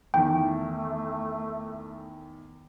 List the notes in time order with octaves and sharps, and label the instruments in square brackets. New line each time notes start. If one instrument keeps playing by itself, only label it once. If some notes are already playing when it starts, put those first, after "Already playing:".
[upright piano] E2 D#3 [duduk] A3 [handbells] G5